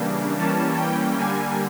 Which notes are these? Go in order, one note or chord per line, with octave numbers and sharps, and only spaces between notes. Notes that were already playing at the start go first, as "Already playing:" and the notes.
Already playing: C#3 E3 G3 A#3 D4
E3 G3 A#3 C#4 A5
G5
D3 G3 A#3 G#5